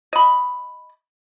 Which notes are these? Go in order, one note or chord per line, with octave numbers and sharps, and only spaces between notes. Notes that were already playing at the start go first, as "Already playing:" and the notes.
D#5 B5